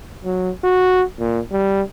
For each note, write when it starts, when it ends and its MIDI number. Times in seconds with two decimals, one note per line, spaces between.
0.25 0.51 54
0.64 1.03 66
1.19 1.40 46
1.52 1.82 55